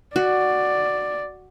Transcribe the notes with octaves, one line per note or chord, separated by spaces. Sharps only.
F#4 D5